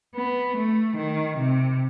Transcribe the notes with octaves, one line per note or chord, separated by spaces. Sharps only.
B3
A3
D#3
C3